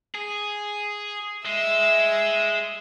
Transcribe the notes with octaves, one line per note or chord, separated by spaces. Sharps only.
G#4
G#3 E5 E6